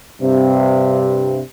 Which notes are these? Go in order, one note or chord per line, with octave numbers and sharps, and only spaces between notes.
G2 C3